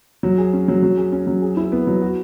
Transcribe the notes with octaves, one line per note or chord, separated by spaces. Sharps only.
F#3
G#4
C#4
F#3
F#3
G#4
C#4
F#3
G#4
E4
B3
F#3
F#4